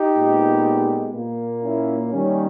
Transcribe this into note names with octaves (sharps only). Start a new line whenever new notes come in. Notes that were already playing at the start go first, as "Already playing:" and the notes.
Already playing: D#4 G4
A#2 G#3 B3
A#2 A#3
C#4 E4
D#3 G3 A#3 C#4